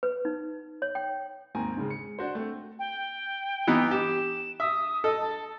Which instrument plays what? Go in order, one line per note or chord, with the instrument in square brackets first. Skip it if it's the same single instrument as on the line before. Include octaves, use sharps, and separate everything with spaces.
[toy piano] B4
D#4
C#5
G5
[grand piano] D#2 G#2 C4 G#5 A#5
G#2 C#3 G#3
C#7
D4 F#4 C5
A3 C4
[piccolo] G5
[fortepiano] E3 B3 D#4
[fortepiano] G4 [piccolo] E7
[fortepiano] E5 [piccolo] D#6
[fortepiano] A4 [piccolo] D#5
[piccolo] A5